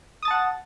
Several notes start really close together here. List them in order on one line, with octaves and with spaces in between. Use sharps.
D#6 A6 A5 F#5